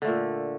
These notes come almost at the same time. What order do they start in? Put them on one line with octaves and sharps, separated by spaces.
D3 A3 A#2